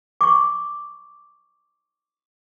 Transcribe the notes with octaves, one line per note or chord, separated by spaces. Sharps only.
C#6 D6